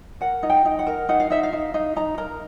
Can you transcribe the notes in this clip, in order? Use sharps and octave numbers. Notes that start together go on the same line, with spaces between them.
A#4 F#5
D#4
G5
D#4
F#5
A#4
D#4 F#5
F5
D#4 E5
F5
D#4
D#4
D#4 A#5
A#4 A#5